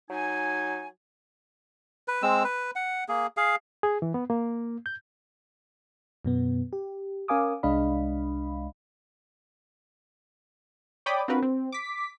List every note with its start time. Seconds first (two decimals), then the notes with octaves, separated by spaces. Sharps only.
0.10 F#3 D#4 G#5
2.08 B4
2.23 G#3 C4 E6
2.44 B4
2.76 F#5
3.08 A#3 G#4
3.37 G#4 F5
3.83 G#4
4.02 E3
4.14 B3
4.30 A#3
4.86 G6
6.25 F#2 B2 B3
6.73 G4
7.28 C#4 A#4 F5 G#5 D6 D#6
7.63 C2 G#3 D4 D#5 F5 B5
11.06 C#5 D5 G5 B5 D6 D#6
11.28 C4 D4 F4 F#4 A#4 B4
11.43 C4
11.72 D6 B6